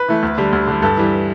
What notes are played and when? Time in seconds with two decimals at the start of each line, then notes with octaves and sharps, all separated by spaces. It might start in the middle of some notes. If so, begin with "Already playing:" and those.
Already playing: B4
0.08 E3 A3
0.23 D2
0.38 D3 G3
0.53 D2
0.67 D3 G3
0.82 G2 A4
0.97 E3 G3